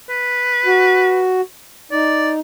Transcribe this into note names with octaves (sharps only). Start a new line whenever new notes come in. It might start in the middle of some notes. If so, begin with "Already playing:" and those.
B4
F#4
D#4 D5